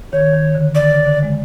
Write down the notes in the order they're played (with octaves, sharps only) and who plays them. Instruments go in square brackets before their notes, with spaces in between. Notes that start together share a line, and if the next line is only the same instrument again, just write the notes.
[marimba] D#3 [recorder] C#5
[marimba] D#3
D3
[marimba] D3 [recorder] D5
[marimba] C#3
D3
G#3